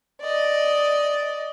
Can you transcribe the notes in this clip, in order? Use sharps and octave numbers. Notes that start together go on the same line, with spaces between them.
D5 D#5